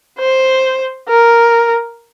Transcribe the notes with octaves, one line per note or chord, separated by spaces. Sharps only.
C5
A#4